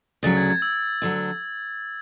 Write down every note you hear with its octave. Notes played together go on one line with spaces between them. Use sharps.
D2 C#3 F#3 A6
G#6
G#6
E6
D2 D3 F#3